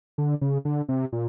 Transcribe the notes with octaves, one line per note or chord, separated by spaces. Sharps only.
D3
C#3
D3
C3
A#2